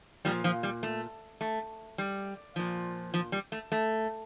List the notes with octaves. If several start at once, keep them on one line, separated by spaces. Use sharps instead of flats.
A#2 F3 G3
F3
G3
A3
A3
G3
A#2 F3
F3
G3
A3
A3